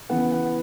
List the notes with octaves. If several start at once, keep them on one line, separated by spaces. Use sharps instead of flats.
C#3 E3 B3 F#5
F#5